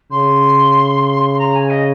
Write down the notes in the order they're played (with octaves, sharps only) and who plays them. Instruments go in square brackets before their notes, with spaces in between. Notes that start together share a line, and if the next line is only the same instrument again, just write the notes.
[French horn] C#3 [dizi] C6
[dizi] C6
A#5
G#5
D#5